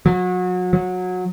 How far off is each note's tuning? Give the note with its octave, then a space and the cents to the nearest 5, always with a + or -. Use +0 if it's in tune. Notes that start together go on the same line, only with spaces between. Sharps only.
F#3 -30
F#3 -20